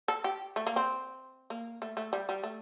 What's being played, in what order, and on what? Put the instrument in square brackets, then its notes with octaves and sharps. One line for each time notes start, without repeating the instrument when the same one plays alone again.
[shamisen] A4
G4
A3
A#3
C4
A#3
A3
A3
G3
G3
A3